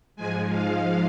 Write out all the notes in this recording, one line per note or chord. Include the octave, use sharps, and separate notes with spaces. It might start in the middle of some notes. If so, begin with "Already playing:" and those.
G#2 F3 G#3 G#5
F5